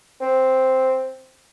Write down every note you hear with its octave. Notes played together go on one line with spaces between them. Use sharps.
C4